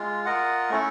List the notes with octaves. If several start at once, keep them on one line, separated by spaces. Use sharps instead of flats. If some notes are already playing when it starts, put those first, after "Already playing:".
Already playing: G#3 F4
F4 A#4 D#5 F#5
A3 C#4 E4 A4